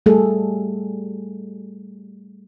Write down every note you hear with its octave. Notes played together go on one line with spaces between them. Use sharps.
G3 A3 G#4 A4